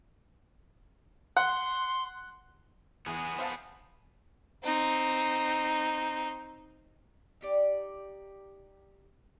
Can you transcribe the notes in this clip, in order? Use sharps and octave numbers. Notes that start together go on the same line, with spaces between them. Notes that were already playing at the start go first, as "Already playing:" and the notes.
F#5 C6
E2 B3 G#4
C5 F5 A5
C4 D#4
D#4 G4 D5